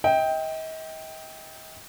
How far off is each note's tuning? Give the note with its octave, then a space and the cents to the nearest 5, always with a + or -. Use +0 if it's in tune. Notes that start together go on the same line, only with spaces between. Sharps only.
D#5 +40 G5 +0